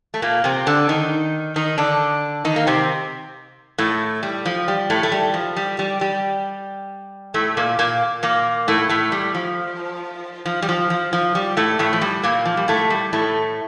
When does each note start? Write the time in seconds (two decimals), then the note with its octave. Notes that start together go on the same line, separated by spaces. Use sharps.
0.14 A3
0.22 A#2 A#3
0.44 C3 C4
0.66 D3 D4
0.89 D#3 D#4
1.56 D#3 D#4
1.78 D3 D4
2.45 D#3 D#4
2.56 A#3
2.67 C3 C4
3.78 A2 A3
4.23 G3
4.45 F3
4.68 G3
4.90 A2 A3
5.03 A3
5.12 G3
5.34 F3
5.56 G3
5.79 G3
6.01 G3
7.34 A2 A3
7.57 A#2 A#3
7.79 A#2 A#3
8.23 A#2 A#3
8.68 A2 A3
8.89 A2 A3
9.12 G3
9.35 F3
10.46 F3
10.62 G3
10.69 F3
10.90 F3
11.13 F3
11.35 G3
11.57 A2 A3
11.79 A2 A3
11.93 F3
12.01 G3
12.23 A#2 A#3
12.45 F3
12.57 G3
12.68 A2 A3
12.90 G3
13.13 A2 A3